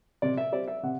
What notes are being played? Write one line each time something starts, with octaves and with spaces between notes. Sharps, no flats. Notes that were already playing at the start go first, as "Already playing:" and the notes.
C3 D5
E5
G3 C4 D5
E5
C3 F#5